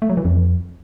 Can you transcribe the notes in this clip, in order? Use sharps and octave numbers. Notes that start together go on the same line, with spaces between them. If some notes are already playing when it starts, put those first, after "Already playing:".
A3
F#3
E3
F2